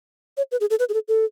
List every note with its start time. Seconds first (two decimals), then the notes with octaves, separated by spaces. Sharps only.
0.37 C#5
0.52 B4
0.61 G#4
0.70 A4
0.79 B4
0.89 G#4
0.94 A4
1.08 A4